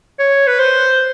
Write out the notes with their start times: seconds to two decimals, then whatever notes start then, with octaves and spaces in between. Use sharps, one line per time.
0.19 C#5
0.47 B4
0.59 C5